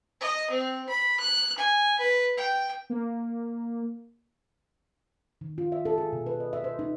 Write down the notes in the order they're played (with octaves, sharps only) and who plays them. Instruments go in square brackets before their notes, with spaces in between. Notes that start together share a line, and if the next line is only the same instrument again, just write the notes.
[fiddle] D#5
C4
B5
F#6
G#5
B4
G5
[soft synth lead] A#3
[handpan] D#3
F4
E5
A4
G#4
B2
B4
D#5
E5
C5
D#4